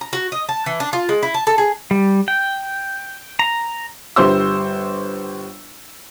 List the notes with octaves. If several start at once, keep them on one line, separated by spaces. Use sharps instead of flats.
A#5
F#4
D#5
A5
E3
D4
F4
G#3
E4
A5
A4
G#4
G3
G5
A#5
G1 G3 C5 C6 E6